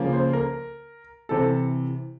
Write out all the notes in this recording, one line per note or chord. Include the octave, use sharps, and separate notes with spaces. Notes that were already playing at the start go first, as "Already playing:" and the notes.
Already playing: C#3 F3 A#3
C5
A#4
C3 E3 A4